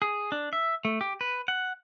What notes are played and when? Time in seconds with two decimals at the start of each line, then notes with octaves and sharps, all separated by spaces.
0.02 G#4
0.32 D4
0.53 E5
0.85 A3
1.01 G4
1.21 B4
1.48 F#5